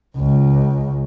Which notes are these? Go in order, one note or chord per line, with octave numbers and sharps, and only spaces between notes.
C#2